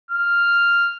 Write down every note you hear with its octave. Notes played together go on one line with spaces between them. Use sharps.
F6